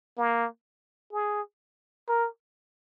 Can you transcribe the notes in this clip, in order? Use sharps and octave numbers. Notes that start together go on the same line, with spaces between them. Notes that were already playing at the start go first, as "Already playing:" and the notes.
A#3
G#4
A#4